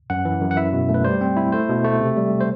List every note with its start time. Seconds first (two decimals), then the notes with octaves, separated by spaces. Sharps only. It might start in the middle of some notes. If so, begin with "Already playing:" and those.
0.10 F#2 F#5
0.25 E3
0.41 F#2
0.51 F#5
0.57 E4 E5
0.73 B2
0.89 A3
0.94 B4
1.05 G3 C5
1.21 C4
1.37 E4
1.52 A3 C5
1.69 B2
1.84 A3
2.00 C3
2.17 G3
2.40 C5